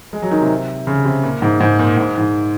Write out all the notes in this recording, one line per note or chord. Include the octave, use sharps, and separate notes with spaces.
G#3
F#3
D#3
C3
C#3
C3
A#2
G#2
G#2
A#2
G#2
G#2